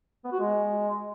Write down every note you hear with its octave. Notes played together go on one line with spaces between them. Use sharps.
B3
F#4
G#3